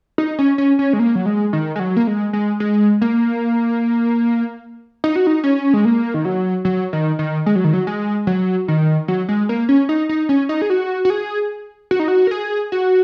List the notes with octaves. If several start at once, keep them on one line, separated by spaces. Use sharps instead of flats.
D#4
C#4
C#4
C#4
G#3
A#3
F#3
G#3
D#3
G#3
F#3
A#3
G#3
G#3
G#3
A#3
D#4
F#4
D#4
C#4
G#3
A#3
D#3
F#3
F#3
D#3
D#3
G#3
F#3
D#3
F#3
G#3
F#3
D#3
F#3
G#3
A#3
C#4
D#4
D#4
C#4
D#4
G#4
F#4
F#4
G#4
F#4
D#4
F#4
A#4
G#4
F#4